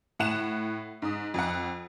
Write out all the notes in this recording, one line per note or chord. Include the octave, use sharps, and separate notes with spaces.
A2 F#5 E7
G#2 D#6
F2 F#5